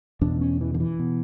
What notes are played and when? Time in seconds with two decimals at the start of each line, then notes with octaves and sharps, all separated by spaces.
0.21 E2 B2 D4
0.41 C#4
0.61 E3
0.74 D3
0.80 E3
0.99 B2